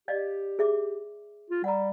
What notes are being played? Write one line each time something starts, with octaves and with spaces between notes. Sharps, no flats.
G4 D5 D#5 F5
G#4 E5 D6
F4
G3 F#5 A#5